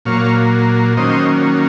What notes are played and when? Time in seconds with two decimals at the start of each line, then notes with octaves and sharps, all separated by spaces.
0.05 A#2 F#3 A#3 C#5 F5
0.97 D#3 F#3 A#3 C#4 C5 D#5